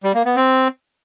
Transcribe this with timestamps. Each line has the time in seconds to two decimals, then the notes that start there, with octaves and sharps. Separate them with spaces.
0.04 G3
0.14 A#3
0.25 B3
0.36 C4